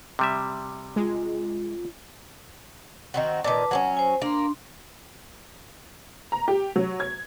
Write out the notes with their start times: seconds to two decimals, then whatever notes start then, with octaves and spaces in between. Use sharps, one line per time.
0.19 C3 G3 E5
0.96 G#3 F4
3.14 D#3 C4 F#4
3.44 A#2 D#3 B4 A5 D6
3.71 F#3 C4 C#4 F#5
3.97 C5 G#5
4.22 A#3 D4 C6
6.32 A#5
6.48 G4
6.76 F#3
7.00 G#6